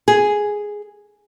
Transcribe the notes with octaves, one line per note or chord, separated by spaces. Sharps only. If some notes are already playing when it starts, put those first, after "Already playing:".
G#4